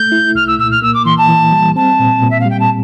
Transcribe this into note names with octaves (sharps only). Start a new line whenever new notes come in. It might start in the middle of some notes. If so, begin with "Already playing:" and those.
Already playing: A3 G6
E4
C2 F6
E6
A#2 E6
F6
A#3 E6
D6
E3 C6
A5
E3
G3
C4 A5
A#2
A#2
E5
F5
G3 G5
A5